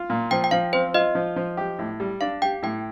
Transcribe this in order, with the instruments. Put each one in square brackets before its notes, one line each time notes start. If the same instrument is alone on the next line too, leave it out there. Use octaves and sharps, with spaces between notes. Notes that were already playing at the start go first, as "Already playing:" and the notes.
Already playing: [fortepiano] F4
A#2
[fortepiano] F3 [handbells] G5
[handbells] G5
[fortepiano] F3 [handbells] F5
[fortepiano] C4 [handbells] C5
[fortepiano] F4 [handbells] D#5
[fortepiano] F3
F3
G4
A2
G3
[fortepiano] D4 [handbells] F5
[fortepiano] G4 [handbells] G5
[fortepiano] A2 [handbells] G5